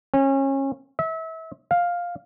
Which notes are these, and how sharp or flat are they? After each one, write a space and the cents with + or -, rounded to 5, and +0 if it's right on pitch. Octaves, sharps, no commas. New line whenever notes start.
C#4 -30
E5 -30
F5 +5